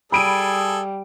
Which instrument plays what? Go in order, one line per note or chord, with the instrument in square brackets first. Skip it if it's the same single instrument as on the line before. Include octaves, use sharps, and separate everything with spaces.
[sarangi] G3 [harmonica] G#4 A4 [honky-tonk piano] B5 D7 D#7